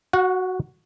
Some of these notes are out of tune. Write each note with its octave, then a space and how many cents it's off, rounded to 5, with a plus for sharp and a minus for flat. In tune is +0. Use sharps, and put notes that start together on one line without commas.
F#4 +0 F#5 -35